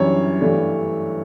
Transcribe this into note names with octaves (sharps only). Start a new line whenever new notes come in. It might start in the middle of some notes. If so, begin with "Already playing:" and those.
Already playing: F#2 E3 G3 D4 C#5
G2 E3 A3 D4